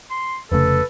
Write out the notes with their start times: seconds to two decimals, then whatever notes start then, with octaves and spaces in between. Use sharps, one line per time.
0.11 C6
0.52 F1 C#3 A3 A4 B4